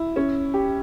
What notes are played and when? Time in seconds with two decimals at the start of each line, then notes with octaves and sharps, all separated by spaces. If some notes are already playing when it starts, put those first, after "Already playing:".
Already playing: E4
0.16 C#4
0.54 G4